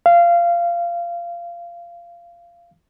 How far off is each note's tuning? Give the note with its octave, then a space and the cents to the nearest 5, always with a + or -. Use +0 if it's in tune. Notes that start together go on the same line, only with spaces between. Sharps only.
F5 -20